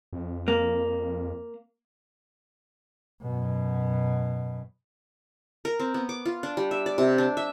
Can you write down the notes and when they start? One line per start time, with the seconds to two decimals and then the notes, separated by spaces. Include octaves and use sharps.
0.13 F2
0.48 A#3
3.23 F#2 B2
5.65 A#4
5.79 C4
5.94 B3
6.09 D6
6.25 F4
6.43 D4
6.57 G3
6.71 E5
6.86 D5
6.98 C3
7.18 D4
7.37 E5